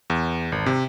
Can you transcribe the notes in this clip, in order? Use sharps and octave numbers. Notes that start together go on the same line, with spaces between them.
E2
G#1
C3